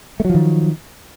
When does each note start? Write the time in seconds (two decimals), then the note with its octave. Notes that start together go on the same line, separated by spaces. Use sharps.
0.20 A3
0.25 F#3
0.30 F3
0.34 D#3